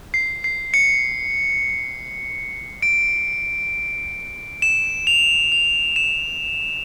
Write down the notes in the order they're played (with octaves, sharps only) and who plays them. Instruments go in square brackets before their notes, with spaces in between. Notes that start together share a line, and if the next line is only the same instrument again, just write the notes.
[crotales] C7
C7
C#7
D7
E7
F7
F7
E7